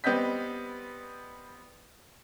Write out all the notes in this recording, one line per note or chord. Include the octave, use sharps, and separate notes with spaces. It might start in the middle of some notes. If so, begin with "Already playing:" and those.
G3 B3 C4 D#5 G6 B6